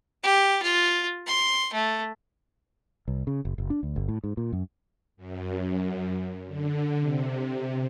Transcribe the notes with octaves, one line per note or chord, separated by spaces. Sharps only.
G4
F4
C6
A3
C2
C#3
F#1
F#1
D4
D2
G1
A2
G#2
A#2
F#2
F#2
D3
C3